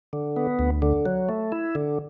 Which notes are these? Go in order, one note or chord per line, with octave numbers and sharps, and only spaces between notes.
D3
B3
D2
D3
F#3
A3
E4
D3